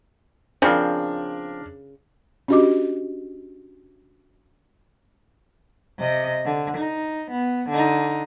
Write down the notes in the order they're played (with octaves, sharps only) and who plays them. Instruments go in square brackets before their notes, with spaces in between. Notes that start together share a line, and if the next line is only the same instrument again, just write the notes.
[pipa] C#3 [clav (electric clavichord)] F3 C4 [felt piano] D4 A#4
[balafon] C#4 D4 F#4 G4 D#5 D6
[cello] C3 D#5
D3
D#4
B3
D3 D#4